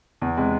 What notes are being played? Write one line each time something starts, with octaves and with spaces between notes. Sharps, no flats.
E2
C3 G#3